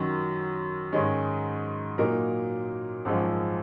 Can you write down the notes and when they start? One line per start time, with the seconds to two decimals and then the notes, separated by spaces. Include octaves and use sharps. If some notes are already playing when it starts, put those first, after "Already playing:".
Already playing: F#2 D#3 F#3
0.92 G#2 D#3 G#3 C#4
1.98 A#2 F#3 A#3 D#4 A#4
3.05 G#1 F#2 F3 G#3